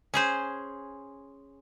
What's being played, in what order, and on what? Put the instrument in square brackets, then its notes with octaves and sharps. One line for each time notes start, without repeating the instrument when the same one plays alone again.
[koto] C#4 G#4 C5